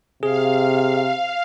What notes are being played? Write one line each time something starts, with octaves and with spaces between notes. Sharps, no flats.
C3 G#4 F5